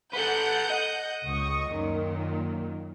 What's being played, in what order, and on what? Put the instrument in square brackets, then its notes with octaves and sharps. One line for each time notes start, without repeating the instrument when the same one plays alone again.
[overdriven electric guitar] A4 B4 [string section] F#5 G6
[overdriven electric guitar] D#5
[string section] C#2 C#6 D#6
F#2 A#2 D#3